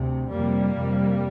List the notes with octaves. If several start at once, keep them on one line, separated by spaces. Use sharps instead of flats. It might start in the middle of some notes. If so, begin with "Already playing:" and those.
Already playing: D2 C3
F2 C3 G3 A#3
F2 C3